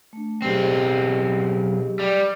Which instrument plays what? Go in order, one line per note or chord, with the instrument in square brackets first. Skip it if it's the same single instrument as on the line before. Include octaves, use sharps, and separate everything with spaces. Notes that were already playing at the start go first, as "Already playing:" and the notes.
[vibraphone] A3 D4
[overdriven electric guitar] B1 C4 [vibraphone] F#3 G4 G#4
[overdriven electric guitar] G3